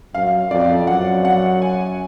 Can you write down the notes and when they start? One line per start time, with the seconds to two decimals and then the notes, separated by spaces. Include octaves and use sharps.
0.14 F#2 F5
0.50 F2 D5
0.87 F#2 F#5
1.25 F#5
1.62 G#5